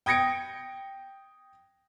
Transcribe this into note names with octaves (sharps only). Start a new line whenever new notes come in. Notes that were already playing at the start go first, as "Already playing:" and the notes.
G5 D#6 G#6 A#6 C#7 D7